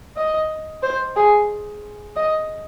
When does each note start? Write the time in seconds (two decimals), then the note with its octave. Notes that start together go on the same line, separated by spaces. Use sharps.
0.17 D#5
0.83 C5
1.16 G#4
2.16 D#5